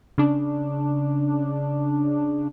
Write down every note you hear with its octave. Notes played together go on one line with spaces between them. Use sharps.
C#3 D4